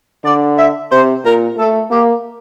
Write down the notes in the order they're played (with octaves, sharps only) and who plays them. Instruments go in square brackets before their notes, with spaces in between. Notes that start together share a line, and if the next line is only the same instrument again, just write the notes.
[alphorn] D3 [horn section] D5
[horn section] E5
[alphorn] C3 [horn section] C5
[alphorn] A#2 [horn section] A#4
[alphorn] A3 [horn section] A4
[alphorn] A#3 [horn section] G4